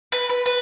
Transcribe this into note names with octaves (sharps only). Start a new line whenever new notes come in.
B4
B4
B4